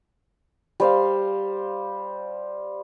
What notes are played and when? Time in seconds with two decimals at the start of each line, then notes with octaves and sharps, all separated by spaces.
0.80 G3 C5 F5